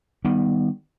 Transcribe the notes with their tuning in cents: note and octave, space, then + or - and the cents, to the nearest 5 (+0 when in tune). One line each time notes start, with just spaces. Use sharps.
D#3 +0 G3 +5 B3 +0